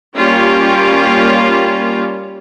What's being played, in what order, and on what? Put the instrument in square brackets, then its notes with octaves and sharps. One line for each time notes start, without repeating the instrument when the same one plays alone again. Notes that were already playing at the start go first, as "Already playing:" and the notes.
[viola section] G3 A#3 C#4 F4 G4